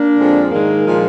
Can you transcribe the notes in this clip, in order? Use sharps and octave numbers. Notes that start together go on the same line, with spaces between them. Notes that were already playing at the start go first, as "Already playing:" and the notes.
Already playing: A#3 D4
F2 D3 F3 G#3
G#2 D#3 G#3 A#3
A#2 F3 G#3